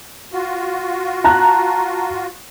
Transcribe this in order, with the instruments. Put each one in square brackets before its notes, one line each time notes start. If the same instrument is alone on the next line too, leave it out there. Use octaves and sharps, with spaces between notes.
[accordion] F4 F#4
[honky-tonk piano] A5 A#5 F#6